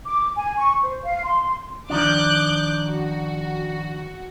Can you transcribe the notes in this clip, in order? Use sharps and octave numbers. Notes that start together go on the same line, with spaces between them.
D6
G#5
C#6
C5
F5
C6
D#3 F3 D4 D6 F#6 G6
F#4